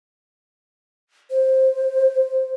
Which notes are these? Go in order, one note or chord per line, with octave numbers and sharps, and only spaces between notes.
C5